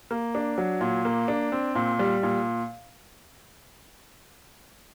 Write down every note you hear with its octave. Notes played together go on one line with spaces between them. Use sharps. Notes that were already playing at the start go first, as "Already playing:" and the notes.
A#3
D4
F#3
A#2
A#3
D4
C4
A#2
G3
A#2